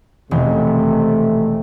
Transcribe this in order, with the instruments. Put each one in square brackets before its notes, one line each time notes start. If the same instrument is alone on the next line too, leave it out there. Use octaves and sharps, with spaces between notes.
[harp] E1 D#3 [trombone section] C3 A3